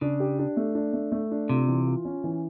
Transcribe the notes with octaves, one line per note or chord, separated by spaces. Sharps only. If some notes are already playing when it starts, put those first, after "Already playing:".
C#3 D4
G4
D4
A3
D4
A3
A3
D4
C3 F4
E3
F4
C#4
E3